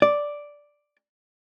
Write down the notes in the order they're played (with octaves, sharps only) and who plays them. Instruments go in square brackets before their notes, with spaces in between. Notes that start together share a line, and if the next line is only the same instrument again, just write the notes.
[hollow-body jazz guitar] D5